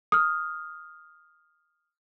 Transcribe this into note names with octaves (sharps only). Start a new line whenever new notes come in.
D#6 F6